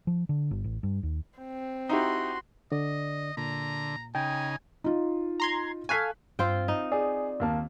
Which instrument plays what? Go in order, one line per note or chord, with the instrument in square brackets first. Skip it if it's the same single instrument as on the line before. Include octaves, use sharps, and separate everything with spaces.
[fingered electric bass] F3
D3
G1
A1
G2
D#2
[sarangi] C4
[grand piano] D#4 E4 G4 [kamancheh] F#4 C6
[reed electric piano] D3 D5 [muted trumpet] D#5
[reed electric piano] A#2 [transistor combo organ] D3 [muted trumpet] A#5
[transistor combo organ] C#3 D#4 [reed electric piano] G5 [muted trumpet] G#5
[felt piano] D#4 F4
[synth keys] A#5 C6 G#6
[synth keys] A4 F5 G#5 [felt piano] C#6 F#6 B6
[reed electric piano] G2 [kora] C4 F4 G5
[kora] D#4
[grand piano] G#4 [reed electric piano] D5
[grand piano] D#2 A#3 A5